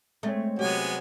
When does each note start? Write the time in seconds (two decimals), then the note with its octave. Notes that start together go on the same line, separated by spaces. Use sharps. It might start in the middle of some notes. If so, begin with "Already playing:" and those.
0.23 G#3 A3 C4 C#5
0.59 C3 F#3 G#3 B3 C#4 G4 G#5